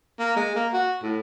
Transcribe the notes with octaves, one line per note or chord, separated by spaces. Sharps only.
A#3
G#3
A#3
F#4
A2